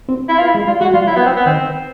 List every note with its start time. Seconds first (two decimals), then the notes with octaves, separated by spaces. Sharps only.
0.09 C4
0.29 E4
0.38 B3 F4
0.48 E4
0.55 G#3
0.67 G3 F4
0.81 G#3 F#4
0.94 G3 F4
1.07 F#3 E4
1.16 B3
1.26 C4
1.37 B3
1.46 D#3 C4